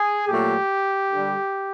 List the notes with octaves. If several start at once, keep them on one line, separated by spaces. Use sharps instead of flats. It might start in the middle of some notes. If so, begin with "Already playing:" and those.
Already playing: G#4
A#2 F#3 A3 G4
D3 G3